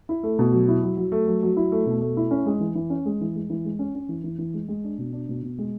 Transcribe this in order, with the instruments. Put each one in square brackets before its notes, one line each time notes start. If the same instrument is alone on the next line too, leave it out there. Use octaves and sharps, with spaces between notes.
[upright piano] E4
A3
B2
F#3
E4
F#3
F#3
A3
F#3
F#3
E4
A3
B2
A3
E4
C#4
G#3
E3
E3
C#4
G#3
E3
G#3
E3
G#3
C#4
C#4
E3
E3
E3
G#3
G#3
D4
B2
D4
B2
B2
G#3